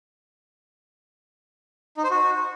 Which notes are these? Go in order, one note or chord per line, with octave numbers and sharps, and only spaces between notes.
D#4
C5
F#4